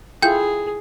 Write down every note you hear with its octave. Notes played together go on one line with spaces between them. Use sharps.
E4 F4 G#4 A4 G5 G6